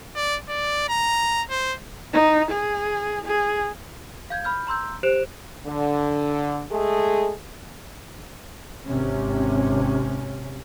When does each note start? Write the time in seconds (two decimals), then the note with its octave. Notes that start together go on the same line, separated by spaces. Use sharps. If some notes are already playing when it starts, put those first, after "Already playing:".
0.15 D5
0.48 D5
0.89 A#5
1.50 C5
2.13 D#4
2.51 G#4
3.25 G#4
4.30 F5 G6 G#6
4.44 B5 F6 G6
4.67 A#5 C6 E6 G6
5.03 G4 C5 F#6 D7 E7 F7
5.67 D3
6.72 G#3 A3 G#4 A4
8.87 G#1 C3 C#4